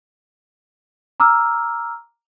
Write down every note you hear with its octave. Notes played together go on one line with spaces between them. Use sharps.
A#5 D6 E6 F6